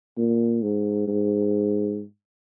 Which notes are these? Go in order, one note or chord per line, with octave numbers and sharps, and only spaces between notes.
A#2
G#2
G#2